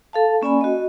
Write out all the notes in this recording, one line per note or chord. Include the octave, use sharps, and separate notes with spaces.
A4 F5 A5
A#3 C#4 D5 G#5 B5
F#4 D#5